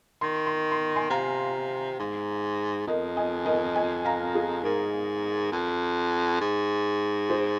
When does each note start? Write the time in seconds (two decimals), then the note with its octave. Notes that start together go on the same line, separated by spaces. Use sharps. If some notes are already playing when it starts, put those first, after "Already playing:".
0.21 D#3 C6
0.46 C6
0.72 C6
0.96 G#5 C6
1.10 C3 F5 A#5
1.99 G#2
2.87 F2 A#4 D#5
3.16 D#5 G#5
3.46 A#4 D#5
3.75 D#5 G#5
4.05 F5 A#5
4.35 G#4
4.63 G#2 A#4
5.52 F2
6.41 G#2
7.29 G#4 C5